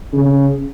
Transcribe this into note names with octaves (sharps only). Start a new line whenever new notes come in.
C#3